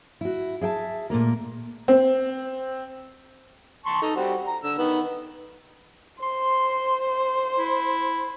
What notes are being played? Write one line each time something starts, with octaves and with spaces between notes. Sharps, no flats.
E4 F#4
G#4 E5 G5 A5
A#2 A3 A#3 A#4
C4
A5 C6 C#6
D#4 A4
G3 C4 F#4
A#5
D3 E6
D#3 B3
C5 C6
E4